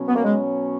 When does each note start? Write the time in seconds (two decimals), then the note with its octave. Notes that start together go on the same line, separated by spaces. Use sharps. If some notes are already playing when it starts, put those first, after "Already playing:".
Already playing: B2 F#3 C#4
0.08 B3
0.16 A#3
0.24 G#3